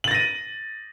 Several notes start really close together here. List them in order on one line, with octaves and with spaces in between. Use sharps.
F#7 A6 A#6 D#7